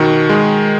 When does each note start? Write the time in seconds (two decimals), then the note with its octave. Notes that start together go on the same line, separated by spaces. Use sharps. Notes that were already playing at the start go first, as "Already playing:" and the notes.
Already playing: B2 D#3 F#4
0.29 G#3